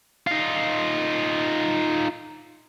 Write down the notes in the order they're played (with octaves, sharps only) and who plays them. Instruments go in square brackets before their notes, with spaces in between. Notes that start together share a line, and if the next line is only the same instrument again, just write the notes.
[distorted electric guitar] D#4 F4